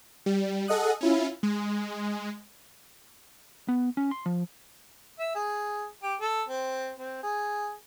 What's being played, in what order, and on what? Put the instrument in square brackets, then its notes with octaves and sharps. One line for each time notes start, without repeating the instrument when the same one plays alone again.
[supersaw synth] G3
G#4 A4 D#5 F#5 D#6 F#6
C#4 E4 F4
G#3
[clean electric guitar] B3
C#4
C6
F3
[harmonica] E5
G#4
G4
A4
C4
C4
G#4